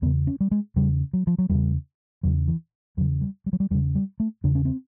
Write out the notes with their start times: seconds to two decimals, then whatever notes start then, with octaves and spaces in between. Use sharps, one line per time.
0.02 E2 B3
0.05 C#3
0.27 C#4
0.40 G3
0.51 G#3
0.76 E2 C#3 G3
1.13 F#3
1.27 F3
1.38 F#3
1.50 E2 C#3 G3
2.23 E2 C#3 F#3
2.48 E3
2.97 E2 F#3
3.01 C#3
3.21 G3
3.46 G3
3.53 F#3
3.60 G3
3.70 E2 G3
3.75 C#3
3.95 G3
4.20 A3
4.44 E2 C#3 D4
4.55 C#4
4.65 C4